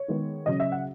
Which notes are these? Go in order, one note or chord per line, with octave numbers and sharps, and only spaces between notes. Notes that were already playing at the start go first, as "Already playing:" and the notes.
Already playing: C#5
D#3 G#3 B3
C#3 F#3 C#4 D#5
E5
F#5